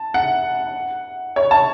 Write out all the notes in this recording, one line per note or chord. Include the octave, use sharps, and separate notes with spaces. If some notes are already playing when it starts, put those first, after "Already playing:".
Already playing: A5
F#5
C#5
A5